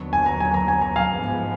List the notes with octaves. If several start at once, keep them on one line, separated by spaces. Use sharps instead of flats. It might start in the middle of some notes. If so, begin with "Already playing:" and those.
Already playing: D#2 D3 F#3 B3
G#5
A#5
G#5
A#5
G#5
A#5
F5 G#5
G#2 F3 G#3 B3